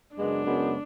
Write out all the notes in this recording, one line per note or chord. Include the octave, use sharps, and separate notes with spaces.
F#2 C#3 G#3 B3 D4
F#2 C#3 G#3 B3